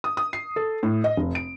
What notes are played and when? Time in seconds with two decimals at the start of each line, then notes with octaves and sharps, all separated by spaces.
0.04 D#6
0.17 D#6
0.33 C7
0.56 A4
0.83 A2
1.04 D#5
1.17 F1
1.35 D7